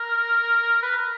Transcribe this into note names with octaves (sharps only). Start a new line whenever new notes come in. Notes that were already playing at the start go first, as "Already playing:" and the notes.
Already playing: A#4
B4
A#4